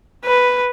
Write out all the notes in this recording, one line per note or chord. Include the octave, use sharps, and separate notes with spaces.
B4